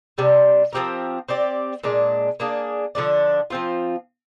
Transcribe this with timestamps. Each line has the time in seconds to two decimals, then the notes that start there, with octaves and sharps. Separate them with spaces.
0.18 C3 G3 D4
0.73 F3 C4 G4 A#4
1.29 C4 G4 D5
1.84 A#2 G#3 D4
2.40 A#3 D4 G#4
2.95 D3 F3 G#3 D4
3.50 F3 C4 F4